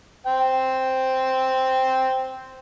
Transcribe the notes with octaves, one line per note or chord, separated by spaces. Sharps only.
C5 G5